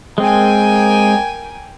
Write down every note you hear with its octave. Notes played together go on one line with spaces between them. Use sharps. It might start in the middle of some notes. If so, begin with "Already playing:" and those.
G#3 A#3 C4 G5 G#5